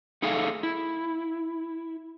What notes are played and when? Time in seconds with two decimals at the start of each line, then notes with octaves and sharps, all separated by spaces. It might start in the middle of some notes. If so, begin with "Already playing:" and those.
0.22 A3 D#4 G#4 A4 E5 F5
0.63 E4